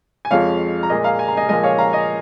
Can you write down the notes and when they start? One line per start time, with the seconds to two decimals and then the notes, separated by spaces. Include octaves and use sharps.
0.25 G#5
0.31 F2 F3 G#3 C#5 F5
0.83 A#5
0.90 A#2 G#3 D#5 G#5
1.04 F5 A#5
1.19 G#5
1.28 A#5
1.37 D#5 G#5
1.49 A#2 F3 G#3 D#5 G#5
1.63 C#5 F5
1.78 F5 A#5
1.93 D#5 G#5